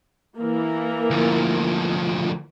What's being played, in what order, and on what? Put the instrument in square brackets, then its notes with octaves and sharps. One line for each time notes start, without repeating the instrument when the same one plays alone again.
[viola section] E3 A#3 A#4
[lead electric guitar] D2 F3